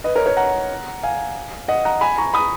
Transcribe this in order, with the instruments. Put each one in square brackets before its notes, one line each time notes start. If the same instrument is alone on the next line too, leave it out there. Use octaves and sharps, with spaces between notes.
[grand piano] B4 D#5
A#4 C#5
A#4 C#5
F#5 A#5
F5 G#5
D#5 F#5
F#5 A#5
G#5 B5
A#5 C#6
B5 D#6